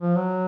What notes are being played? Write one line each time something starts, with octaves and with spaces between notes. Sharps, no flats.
F3
F#3